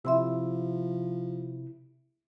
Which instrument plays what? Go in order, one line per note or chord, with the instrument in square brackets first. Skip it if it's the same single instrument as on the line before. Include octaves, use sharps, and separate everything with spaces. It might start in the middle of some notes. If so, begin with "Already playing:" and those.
[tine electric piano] C3 E4 [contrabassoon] F3 [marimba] E5 C6 E6